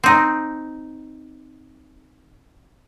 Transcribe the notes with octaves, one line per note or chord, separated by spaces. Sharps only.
C4 D#4